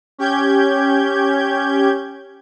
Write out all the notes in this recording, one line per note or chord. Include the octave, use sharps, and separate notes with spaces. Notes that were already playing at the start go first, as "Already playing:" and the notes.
C#4 G4 G6 G#6